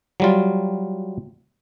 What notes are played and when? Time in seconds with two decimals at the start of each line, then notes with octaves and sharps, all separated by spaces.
0.20 F#3 G3 F4